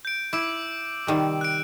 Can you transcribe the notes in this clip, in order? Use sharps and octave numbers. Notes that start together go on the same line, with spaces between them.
G6 D7
E4 D6 E6 D7
C3 D#3 G3
F#6 D7